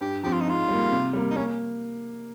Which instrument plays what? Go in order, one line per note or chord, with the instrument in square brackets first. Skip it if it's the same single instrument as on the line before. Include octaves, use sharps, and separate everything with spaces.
[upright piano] G2 [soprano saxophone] G4
[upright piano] F3 C4 [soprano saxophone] G4
[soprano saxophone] F4
D#4
[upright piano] G#2 [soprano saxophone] F4
[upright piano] G3 A#3
C3
G3 A#3
[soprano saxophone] D#4
[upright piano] A#3 [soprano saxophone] C#4